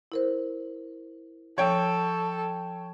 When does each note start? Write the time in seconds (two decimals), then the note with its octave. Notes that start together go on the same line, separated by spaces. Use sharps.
0.12 E4 A#4 C5
1.58 F3 A4 C#5 G5